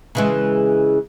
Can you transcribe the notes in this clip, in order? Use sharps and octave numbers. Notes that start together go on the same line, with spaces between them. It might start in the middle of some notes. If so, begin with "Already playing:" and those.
C#3 E3 G#3